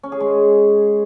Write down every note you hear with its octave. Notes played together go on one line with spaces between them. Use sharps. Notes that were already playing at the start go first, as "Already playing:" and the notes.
C#4
G#4
G#3